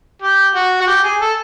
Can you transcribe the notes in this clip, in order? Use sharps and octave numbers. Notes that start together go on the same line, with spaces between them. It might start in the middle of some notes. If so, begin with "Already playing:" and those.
G4
F#4
F#4
G4
G#4
A4